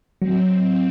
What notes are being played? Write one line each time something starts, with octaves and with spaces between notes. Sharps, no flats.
F#3 C4